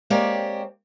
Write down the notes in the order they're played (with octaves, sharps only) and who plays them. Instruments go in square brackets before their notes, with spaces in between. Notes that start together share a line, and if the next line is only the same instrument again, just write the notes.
[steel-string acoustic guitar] G#3 A#3 C4 G4 C#5 D5